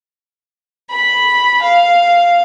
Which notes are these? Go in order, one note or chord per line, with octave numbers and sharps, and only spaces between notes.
B5
F5